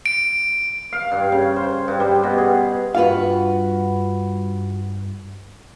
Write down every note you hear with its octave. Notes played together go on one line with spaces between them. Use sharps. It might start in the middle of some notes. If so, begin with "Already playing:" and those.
D7
F5
G2
C#3
C5
G2
G3
B2
G#4
G2 F4 F#4 B4 F5